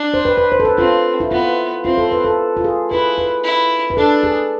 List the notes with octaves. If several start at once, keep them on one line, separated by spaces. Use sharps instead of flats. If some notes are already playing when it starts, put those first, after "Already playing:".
Already playing: D4
C5
B4
B4
C5
A4
B4
C4 F4
E4
B3 F4
C4 F4
A4
B4
A4
F4
G#4
E4 B4
B4
E4
B4
D4 A4
G#4